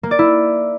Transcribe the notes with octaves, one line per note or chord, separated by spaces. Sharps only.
A#3
D5
E4